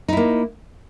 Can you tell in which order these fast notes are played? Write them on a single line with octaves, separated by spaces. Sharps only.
D#4 E4 A#3